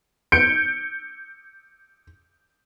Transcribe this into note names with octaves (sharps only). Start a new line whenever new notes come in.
G6 C#7 D7